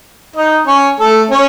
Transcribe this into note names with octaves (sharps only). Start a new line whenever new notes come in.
D#4 D#5
C#4 C#5
A3 A4
C#4 C#5